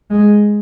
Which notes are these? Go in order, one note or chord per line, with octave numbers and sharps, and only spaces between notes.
G#3